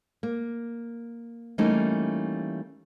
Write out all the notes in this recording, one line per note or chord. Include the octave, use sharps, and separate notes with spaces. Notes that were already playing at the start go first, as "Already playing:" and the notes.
A#3
E3 G3 A3 A#3 C#4 D#4